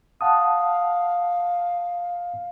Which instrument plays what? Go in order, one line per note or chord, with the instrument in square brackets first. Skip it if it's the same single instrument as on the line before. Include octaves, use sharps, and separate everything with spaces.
[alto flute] F5 [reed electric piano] F#5 A5 D#6